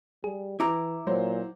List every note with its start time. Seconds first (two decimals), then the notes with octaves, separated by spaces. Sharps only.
0.24 G3 G#4
0.60 E3 E4 A#5 D6
1.07 A#2 F#3 C5